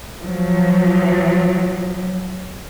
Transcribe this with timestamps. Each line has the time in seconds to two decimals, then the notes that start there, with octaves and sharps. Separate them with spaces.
0.22 F3 F#3